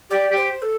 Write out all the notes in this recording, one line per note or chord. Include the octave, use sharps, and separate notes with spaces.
G4 D5
G4
C5
A4